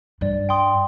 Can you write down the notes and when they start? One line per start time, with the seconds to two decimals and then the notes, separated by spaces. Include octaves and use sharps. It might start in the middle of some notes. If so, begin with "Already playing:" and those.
0.21 G2 D5
0.49 G5 C6 D#6